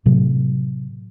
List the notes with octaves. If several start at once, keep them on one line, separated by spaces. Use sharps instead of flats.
A2 C3 F#3